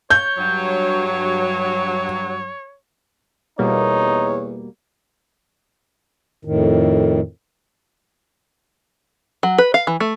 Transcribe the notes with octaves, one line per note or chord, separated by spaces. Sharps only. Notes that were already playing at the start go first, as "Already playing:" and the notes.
C#5 G6
G2 F#3
E2 B2 G3 A#3 D#4 C#5
F2 A2 D#3
F#3
B4
F5
E3
A3